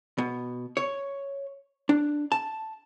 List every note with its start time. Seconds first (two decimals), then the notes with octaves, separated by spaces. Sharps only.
0.18 B2
0.77 C#5
1.89 D4
2.32 A5